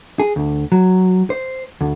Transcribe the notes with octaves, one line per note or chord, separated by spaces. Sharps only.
G#4
D2
F#3
C5
D2